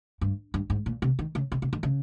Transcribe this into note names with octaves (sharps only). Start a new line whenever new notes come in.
G2
G2
G#2
A#2
C3
D#3
C#3
C3
C3
D#3
C#3